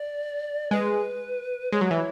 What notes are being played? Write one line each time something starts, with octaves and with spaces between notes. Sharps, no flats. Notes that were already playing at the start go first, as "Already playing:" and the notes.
Already playing: D5
G#3 B4
G#3 C#5
F#3
E3